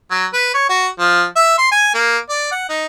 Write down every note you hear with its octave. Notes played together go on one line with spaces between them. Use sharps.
F#3
B4
C#5
F#4
F3
E5
C6
G#5
A#3
D5
F#5
D#4